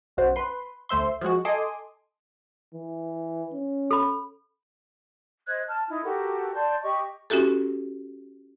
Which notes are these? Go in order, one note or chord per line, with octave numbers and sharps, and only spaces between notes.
B1 F#2 F#4 C5
B4 C6
D2 A3 C5 E5 C6
F3 F#3 G#3 F#4
A4 D#5 G#5 C6 D6 D#6
E3
C#4
A4 B5
C5 D#5 F#6 G#6
A5 F6
D#4 E4
F#4 G4 A4 A#4
D5 A5 C6 G6
G4 D#5 C#6
C#4 E4 F#4 G4 A4